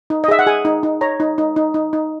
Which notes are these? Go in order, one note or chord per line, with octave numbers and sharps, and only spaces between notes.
D#4
D#5
G#4 E5
F#5
G#4 G#5
D#4
D#4
C#5 A#5
D#4
D#4
D#4
D#4
D#4